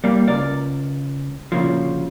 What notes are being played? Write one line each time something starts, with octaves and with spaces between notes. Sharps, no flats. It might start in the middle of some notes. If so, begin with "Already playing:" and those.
G3 A#3
C#2 A#4 D5
D2 A#2 C#3 F3